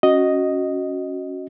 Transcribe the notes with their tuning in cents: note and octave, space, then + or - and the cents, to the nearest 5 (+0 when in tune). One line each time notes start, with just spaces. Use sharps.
C#4 +0 F#4 +0 D#5 +0